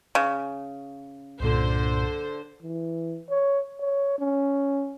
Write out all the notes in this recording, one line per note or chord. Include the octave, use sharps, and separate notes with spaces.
C#3
C2 G2 A#2 D3 C5
E3
C#5
C#5
C#4